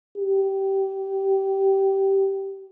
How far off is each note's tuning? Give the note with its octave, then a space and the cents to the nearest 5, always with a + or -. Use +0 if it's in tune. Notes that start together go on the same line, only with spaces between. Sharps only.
G4 -15